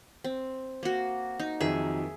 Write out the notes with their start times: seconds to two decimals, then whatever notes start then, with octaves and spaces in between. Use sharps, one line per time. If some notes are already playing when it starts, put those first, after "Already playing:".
0.24 C4
0.83 A#3 F#4
1.40 D#4
1.61 F2 D#3 F#3 G#4 E5